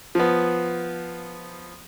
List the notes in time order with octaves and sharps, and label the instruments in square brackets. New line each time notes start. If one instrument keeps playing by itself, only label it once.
[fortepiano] F3 B3